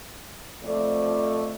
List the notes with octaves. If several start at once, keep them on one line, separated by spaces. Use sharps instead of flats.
F2 A3 D5